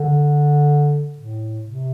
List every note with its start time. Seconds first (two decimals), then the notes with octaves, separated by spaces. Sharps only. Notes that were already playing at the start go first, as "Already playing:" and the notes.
Already playing: D3
1.18 A2
1.65 C3